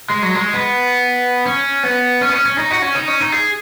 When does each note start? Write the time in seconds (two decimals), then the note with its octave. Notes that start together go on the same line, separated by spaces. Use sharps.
0.10 G#3
0.22 F#3
0.35 G#3
0.53 B3
1.46 C#4
1.83 B3
2.21 C#4
2.29 B3
2.33 C#4
2.46 C#4
2.58 D#4
2.71 F#4
2.82 C#4
2.95 D#4
3.08 C#4
3.20 D#4
3.32 G#4